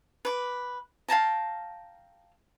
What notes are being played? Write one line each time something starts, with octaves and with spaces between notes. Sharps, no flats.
B4 D6
F5 G5 A5 A#5